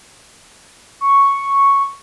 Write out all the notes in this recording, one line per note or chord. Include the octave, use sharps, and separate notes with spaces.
C#6